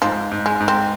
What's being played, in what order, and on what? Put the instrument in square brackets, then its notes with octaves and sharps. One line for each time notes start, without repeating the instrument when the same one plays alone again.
[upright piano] G#2 [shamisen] F3
[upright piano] G#2
[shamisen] G#3
[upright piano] G#2
[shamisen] C4